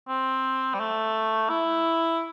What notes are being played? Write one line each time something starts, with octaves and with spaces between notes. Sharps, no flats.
C4
G3
A3
E4